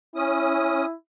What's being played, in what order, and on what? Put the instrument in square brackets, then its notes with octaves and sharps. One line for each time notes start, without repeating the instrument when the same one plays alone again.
[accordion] C#4 D#6 [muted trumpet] E4